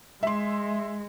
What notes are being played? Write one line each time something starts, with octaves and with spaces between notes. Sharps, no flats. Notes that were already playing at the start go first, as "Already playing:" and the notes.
G#3 E5 C6